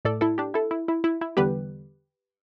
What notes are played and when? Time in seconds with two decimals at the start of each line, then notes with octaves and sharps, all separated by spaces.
0.05 A2 A3 A4 D5
0.21 E4 A4
0.38 D4 G4
0.54 E4 A4
0.71 E4
0.88 E4
1.04 E4
1.21 E4
1.37 E2 D3 G3 B3 G4 B4